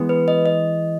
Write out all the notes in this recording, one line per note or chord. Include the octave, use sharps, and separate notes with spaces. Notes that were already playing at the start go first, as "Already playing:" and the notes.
Already playing: E3 G#3 B3
B4
D#5
D#5